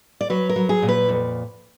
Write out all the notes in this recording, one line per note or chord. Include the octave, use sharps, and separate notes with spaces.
D5
F#3 B4
A#4
F#3
G#4
A#2
B4
F2